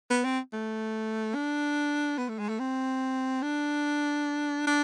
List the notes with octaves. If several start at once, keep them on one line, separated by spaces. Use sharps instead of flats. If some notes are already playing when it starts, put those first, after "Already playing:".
B3
C4
A3
D4
B3
A3
G#3
A3
C4
D4
D4